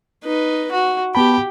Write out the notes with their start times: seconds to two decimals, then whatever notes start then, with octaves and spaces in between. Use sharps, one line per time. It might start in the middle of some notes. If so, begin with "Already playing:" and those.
0.24 D#4 B4
0.72 F#4
1.15 B3 G4 G5 A5 B5